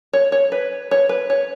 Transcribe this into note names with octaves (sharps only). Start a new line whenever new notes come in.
C#5
C#5
B4
C#5
B4
C#5